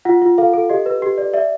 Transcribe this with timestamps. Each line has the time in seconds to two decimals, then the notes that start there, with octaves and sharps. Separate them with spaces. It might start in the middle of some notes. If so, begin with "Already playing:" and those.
0.05 F4 F#5
0.22 F4
0.38 A4 F5
0.53 A4
0.70 G4 D#5
0.86 B4
1.02 G4
1.18 D5
1.33 D5 E5